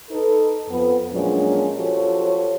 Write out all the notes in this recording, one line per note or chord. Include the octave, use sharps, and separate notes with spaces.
D#4 A4 B4
F2 B3
A#2 F3 F#3 G#3 C#4 D4
F3 F#4 G4 A4 C#5